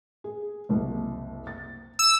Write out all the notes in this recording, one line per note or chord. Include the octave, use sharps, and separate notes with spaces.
G#4
F#1 C2
A6
E6